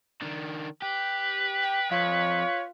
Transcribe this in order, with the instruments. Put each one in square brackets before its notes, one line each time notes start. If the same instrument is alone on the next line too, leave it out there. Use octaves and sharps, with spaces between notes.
[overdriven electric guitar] D#3 D4
[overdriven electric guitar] G4 [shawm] B4
[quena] G5
[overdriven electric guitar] F2 [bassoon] F4 [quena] C#5